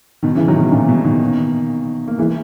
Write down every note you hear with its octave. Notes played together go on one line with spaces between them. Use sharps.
B2 D#3
C#3 E3
D#3 F#3
B2 D#3
A#2 C#3
B2
B2 D#3
A#3
E3 G#3